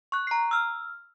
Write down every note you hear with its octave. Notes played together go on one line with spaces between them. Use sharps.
C#6 F#6
A#5 C7
E6 F6